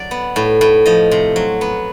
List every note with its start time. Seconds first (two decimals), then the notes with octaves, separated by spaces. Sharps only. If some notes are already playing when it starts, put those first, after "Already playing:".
Already playing: F#3 D5
0.11 B3
0.36 A2
0.61 A2
0.86 F3 D#5
1.11 C3
1.36 F#3
1.61 B3